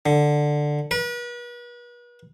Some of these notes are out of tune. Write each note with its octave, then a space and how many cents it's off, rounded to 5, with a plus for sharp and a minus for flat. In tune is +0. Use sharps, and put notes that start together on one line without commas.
D3 +10
B4 -40